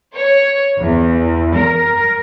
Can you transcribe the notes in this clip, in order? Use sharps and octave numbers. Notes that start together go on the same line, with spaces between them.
C#5
E2
A#4